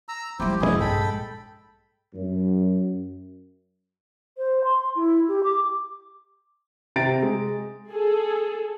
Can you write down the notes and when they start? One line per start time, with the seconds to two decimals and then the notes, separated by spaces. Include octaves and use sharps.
0.09 A#5 E6
0.40 F3 G3 E4 G4 C5
0.60 F1 A#1 C#3 G#3 E4 G#4
0.80 G2 A4 G5 B5
2.14 F#2
4.37 C5
4.64 C6
4.95 E4
5.28 G4
5.43 D6
6.96 C3 G5 A#5 A6 D7
7.23 G#3
7.91 G#4 A4